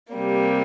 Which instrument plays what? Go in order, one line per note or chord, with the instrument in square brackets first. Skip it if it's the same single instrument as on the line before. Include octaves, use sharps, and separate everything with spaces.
[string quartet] C3 G3 A#3